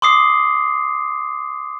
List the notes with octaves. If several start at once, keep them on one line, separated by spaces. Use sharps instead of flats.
C6 D6 D#6 C7